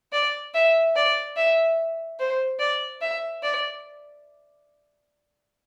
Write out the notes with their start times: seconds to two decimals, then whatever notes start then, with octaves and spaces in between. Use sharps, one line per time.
0.12 D5
0.54 E5
0.96 D5
1.37 E5
2.19 C5
2.59 D5
3.01 E5
3.43 D5